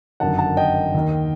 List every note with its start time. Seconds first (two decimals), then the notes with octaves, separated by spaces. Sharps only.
0.20 G1 F#2 D#3 F#5 A5
0.39 F#5 A5
0.57 D#5 G5
0.94 D#2 D#3